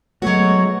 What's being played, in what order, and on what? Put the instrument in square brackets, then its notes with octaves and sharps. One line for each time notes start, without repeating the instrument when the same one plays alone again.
[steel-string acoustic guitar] F#3 F#4 [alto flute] G#3 [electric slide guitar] A3 B3 [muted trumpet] C#5